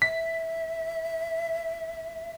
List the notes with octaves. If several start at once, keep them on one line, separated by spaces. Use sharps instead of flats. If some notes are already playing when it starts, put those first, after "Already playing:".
E5 B6